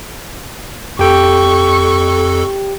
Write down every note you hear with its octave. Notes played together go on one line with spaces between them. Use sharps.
F2 G4 A4 G5 C#6